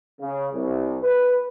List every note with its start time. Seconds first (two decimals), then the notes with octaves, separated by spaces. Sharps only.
0.20 C#3
0.53 C2
1.02 B4